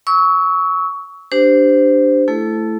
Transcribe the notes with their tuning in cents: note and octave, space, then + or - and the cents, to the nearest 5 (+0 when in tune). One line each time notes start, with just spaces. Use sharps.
C#6 +20 E6 -30
D4 +0 G4 +0 C5 -20
A3 +0 E4 +15 A4 -20